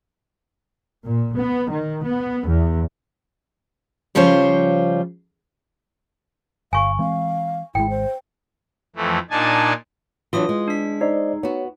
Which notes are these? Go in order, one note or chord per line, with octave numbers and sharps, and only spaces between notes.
A#2
B3
D#3
B3
E2
C#3 F3 G3 F4 C5 C#5
G1 F5 G#5 C#6
E3 G#3 C4 F5
G#1 G#3 E4 G5
C5
F2 E3 A3
A#2 D4 D#4 G#5 A5
E3 F#3 D4 F4 D#6
G#3
D4 B6
D#4 C5 D5 D#5
B3 F#4 C#5